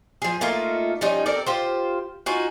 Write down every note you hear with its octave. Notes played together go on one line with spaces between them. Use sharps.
F3 G#4
A3 A#3 D#4 F4
F3 G3 C#4 D#4
C4 A4 A#4 D5
F4 G4 C5
D#4 F4 F#4 G#5